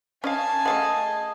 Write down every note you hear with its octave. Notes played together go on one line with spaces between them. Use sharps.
C#4 D#5 F5 G#5 A5
A3 G#4 D#5 F5 F#5